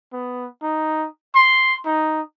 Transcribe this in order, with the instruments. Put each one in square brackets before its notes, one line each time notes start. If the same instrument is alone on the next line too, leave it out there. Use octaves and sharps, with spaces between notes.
[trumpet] B3
D#4
C6
D#4